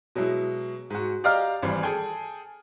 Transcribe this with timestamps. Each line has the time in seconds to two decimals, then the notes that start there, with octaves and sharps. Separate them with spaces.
0.15 B2 F#3 G#3 E4
0.90 G#2 F#4
1.24 G4 D5 D#5 F5 A#5 F6
1.62 G#1 E3 G3
1.83 G#4 A4 G5 G#5